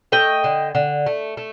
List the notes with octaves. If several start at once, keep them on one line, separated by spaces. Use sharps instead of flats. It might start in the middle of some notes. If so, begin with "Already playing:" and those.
A3 D#5 G5
D3
D3
A3
A3